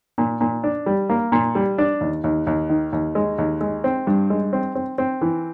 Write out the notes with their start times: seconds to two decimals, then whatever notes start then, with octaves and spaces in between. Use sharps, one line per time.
0.18 A#2
0.41 A#2
0.64 D4
0.86 G3
1.09 A#3
1.32 A#2
1.55 G3
1.78 D4
2.01 D#2
2.24 D#2
2.47 D#2
2.70 D#3
2.93 D#2
3.15 G#3
3.38 D#2
3.61 G#3
3.84 C4
4.07 G2
4.30 G#3
4.53 C4
4.75 C4
4.98 C4
5.21 E3